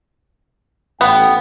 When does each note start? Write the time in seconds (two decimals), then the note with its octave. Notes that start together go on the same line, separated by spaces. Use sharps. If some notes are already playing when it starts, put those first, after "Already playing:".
1.01 A1 B3 G5